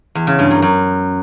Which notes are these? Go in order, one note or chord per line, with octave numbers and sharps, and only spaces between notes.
E2
C#3
G2
F#2
F#2